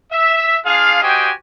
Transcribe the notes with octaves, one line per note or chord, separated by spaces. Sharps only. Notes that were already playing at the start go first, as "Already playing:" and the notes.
E5
D4 F4 G#4 F5
F#4 G4 C5 D#5 G5 G#5